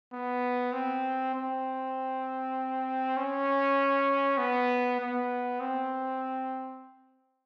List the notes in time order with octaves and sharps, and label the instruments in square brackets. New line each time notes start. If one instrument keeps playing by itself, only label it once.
[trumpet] B3
C4
C4
C#4
B3
B3
C4